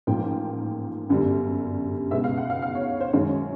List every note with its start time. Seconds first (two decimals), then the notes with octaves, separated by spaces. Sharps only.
0.07 A1 G#2 F3 A#3 G5
1.09 G1 F#2 D3 G3
2.11 C#2 B2 G#3 E5
2.24 F5
2.37 F#5
2.50 F5
2.62 F5
2.75 C#5
3.00 C5
3.13 F#2 D#3 G#3 C#5